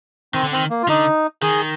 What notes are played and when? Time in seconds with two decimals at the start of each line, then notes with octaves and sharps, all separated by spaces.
0.34 D#3 C4
0.44 D3
0.52 D#3 C4
0.70 A#3
0.83 F4
0.88 D3 D#4
1.42 D#3 G#4